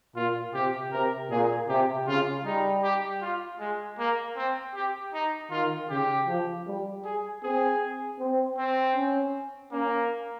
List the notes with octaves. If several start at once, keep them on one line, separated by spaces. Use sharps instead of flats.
A#2 F4
C3 G4
C3 A#4
A#2 G#4
C3 G4
C#3 F4
G3 D#4
G4
F4
G#3
A#3
C4
G4
D#4
D#3 F4
C#3 G4
F3
G3
G#4
C4 G#4
C4
C4
C#4
A#3 C#4